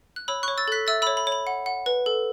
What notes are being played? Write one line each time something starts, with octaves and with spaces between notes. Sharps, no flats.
F#6
C#5 B5 E6
C#5 C#6 F#6
E6 A6
A4 F#6 B6
E5 E6 A6
C#5 B5 E6
B5
C#5
B5
F#5
F#5
B4
A4